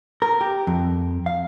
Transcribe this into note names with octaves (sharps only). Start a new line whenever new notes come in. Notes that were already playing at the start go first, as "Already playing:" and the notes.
A#4
G4
F2
F5